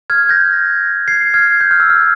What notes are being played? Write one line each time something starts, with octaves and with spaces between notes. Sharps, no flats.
F6 G#6
G6 A#6
G#6 C7
F6 G#6
G6
F6
E6
F6